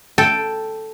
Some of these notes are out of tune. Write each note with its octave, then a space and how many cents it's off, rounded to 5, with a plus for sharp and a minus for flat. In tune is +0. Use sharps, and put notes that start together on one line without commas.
A4 +0 G5 +0